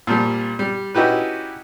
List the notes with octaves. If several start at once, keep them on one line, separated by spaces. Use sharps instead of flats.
A#2 F3 G3
G3
C#4 D#4 E4 F#4 G4 B4